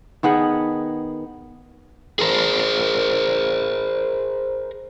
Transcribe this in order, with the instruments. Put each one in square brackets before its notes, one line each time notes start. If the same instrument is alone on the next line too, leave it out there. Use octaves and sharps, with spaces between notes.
[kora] D#3 B3 G#4 F#5
[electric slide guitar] G#4 A#4 C5